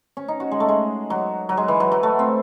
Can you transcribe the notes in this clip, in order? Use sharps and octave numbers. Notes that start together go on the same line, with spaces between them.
C#4
D#4
F#4
G#3
A3
G#3
F#3
F#3
G#3
E3
F#3
F#3
A3
C4